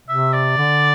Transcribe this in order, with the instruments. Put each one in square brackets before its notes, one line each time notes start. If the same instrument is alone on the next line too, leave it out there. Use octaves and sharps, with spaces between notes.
[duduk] C3 [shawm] E5
[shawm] D5
[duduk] D3